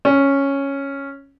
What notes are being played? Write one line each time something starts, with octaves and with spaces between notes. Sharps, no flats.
C#4